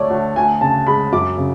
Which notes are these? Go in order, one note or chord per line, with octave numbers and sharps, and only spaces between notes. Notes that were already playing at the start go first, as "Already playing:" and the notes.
Already playing: D2 A3 C#5 D5
D2
D2 G#5
C#3 A5
G#3 B5
F#2 D6
C#3